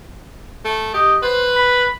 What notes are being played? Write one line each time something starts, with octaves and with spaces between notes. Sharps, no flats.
A3
G4 D#5
B4 C5
B5